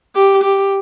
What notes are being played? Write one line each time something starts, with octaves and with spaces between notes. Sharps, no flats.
G4
G4